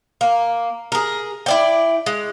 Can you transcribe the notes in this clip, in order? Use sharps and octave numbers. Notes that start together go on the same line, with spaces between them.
A#3
G#4 A#4
E4 D5 G5
G#3